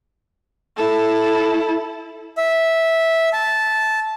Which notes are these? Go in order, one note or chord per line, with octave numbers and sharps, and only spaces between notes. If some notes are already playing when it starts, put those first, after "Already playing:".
E4 A4
E5
A5